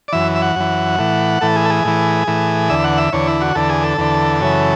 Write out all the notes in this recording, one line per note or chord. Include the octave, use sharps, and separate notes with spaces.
D5
F#2 E3 E5
E5
F#5
F#2 E3
A2 E3
A2 E3 A4
G#4
A4
G#4
A2 E3
A2 E3
E2 D3 E5
F#5
E5
E2 D3 C#5
E4
F#4
E2 D3 A4
G#4
A4
E2 D3
F#2 C#3 E3